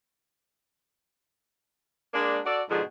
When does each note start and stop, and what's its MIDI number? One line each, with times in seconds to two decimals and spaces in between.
2.14 2.38 56
2.14 2.38 58
2.14 2.38 62
2.46 2.61 66
2.46 2.61 69
2.46 2.61 74
2.70 2.82 44
2.70 2.82 47
2.70 2.82 50
2.70 2.82 53
2.70 2.82 68